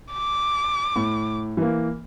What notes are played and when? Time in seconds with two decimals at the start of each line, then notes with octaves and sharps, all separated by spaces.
0.12 D6
0.96 A2
1.57 E3 A#3